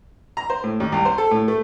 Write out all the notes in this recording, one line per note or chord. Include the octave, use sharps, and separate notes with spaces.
A#5
C5
A2
D#2
C2
C5
A4
A2
A3